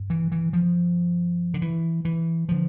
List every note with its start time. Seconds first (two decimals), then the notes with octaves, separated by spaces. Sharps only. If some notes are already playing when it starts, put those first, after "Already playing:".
Already playing: G2
0.10 E3
0.32 E3
0.53 F3
1.54 D3
1.62 E3
2.05 E3
2.49 D3 F3